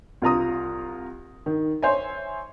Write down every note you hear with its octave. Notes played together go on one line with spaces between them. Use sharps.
C2 F4 A#5 D#6
D#3
C5 C#5 E5 G#5